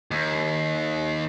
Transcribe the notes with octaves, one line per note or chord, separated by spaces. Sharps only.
D#2